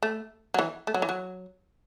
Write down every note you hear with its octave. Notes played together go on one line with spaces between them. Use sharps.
A3
F#3
E3
A3
F#3
E3
F#3